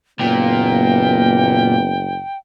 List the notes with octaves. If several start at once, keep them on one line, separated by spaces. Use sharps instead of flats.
F#1 A#2 B3 G5